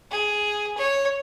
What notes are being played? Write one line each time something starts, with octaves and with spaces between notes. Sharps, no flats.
G#4
C#5